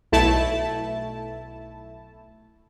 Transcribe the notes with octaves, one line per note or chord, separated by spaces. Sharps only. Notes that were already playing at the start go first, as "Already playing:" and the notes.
B1 A3 E4 A5